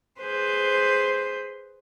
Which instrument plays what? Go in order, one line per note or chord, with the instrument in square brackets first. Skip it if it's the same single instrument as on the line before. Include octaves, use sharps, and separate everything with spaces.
[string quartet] G#4 B4 C5 G6